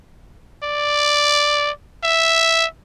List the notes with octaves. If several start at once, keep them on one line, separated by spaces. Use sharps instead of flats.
D5
E5